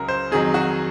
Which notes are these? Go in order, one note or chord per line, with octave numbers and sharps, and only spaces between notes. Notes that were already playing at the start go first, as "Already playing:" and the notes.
Already playing: C#2 C#3 F#3 A#4
C5
F2 D#3 F#3 G#4
F#4